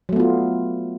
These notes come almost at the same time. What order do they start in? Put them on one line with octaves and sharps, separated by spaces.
F#3 A3 B3 F4